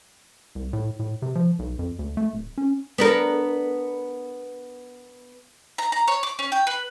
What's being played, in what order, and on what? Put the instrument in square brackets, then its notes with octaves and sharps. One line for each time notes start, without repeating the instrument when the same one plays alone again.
[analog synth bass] C2
A2
A2
C3
F3
B1
F2
D2
A3
D1
C#4
[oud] B3 D4 A#4
[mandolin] A#5
A#5
C#5
D6
C#4
G5
B4